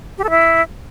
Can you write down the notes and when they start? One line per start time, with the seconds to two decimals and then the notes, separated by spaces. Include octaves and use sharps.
0.18 G4
0.24 A4
0.30 E4